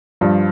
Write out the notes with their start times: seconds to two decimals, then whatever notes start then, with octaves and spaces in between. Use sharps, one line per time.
0.21 G2 F3